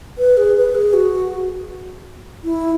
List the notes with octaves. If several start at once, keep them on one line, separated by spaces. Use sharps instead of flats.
B4
G#4
B4
G#4
F#4
E4